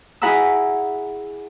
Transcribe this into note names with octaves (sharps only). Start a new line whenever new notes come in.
E4 G#4 F#5 A#5 B5 E6